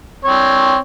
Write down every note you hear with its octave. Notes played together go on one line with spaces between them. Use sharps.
C4 C#5